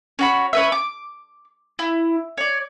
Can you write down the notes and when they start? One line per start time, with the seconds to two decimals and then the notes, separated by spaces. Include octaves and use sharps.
0.19 C#4 F#4 B5
0.53 C#4 B4 E5
0.72 D6
1.79 E4
2.37 C#5 D5